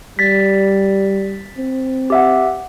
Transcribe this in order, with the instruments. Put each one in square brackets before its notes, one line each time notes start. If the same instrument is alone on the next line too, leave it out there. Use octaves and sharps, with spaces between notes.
[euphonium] G3 [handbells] A6 B6
[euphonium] C4
[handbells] G4 E5 F#5